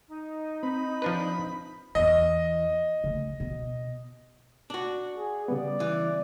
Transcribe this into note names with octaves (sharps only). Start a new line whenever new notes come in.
D#4
C4 B5
F3 D4 B4
E2 E3 D#5
C#3 A3
B2
D4 F#4
G#4
C#3 G3 B3 D5
E3